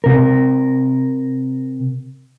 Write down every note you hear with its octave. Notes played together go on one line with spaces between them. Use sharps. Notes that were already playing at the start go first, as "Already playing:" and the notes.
C3 A#4